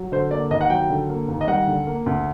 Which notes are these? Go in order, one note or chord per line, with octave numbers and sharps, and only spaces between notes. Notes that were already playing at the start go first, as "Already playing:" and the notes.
Already playing: F#3
D3 C5
A#3 D5
D#2 D#5
F#5
F#3 G5
D3
A#3
D#2
D#5
G3 F#5
D3
A#3
D2